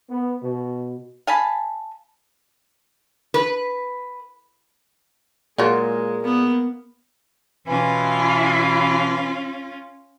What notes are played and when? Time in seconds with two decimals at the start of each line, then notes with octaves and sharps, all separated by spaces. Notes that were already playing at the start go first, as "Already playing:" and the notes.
0.11 B3
0.43 B2
1.27 F5 G#5 A5 B5
3.34 B4
5.58 A#2 F#3 G#3 F4 G#4 A#5
6.22 A#3 B3
7.68 B2 E3 C#4 F4